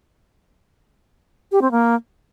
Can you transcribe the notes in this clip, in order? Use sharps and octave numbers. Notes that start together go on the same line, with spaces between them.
G4
C4
A#3